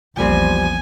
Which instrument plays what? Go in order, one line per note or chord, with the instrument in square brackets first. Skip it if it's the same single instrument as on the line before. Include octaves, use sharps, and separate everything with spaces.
[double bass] A#1 E2 [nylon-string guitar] F3 G3 C4 [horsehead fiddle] G#5